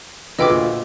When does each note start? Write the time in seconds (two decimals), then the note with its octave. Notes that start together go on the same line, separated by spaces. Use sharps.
0.39 D2 F4 G#4 B4 D#5 G5 D6 E6
0.50 A#2